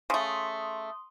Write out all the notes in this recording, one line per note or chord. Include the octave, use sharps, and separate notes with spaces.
C#3 A3 C6 D#6